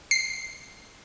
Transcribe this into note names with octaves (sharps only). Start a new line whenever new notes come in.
C7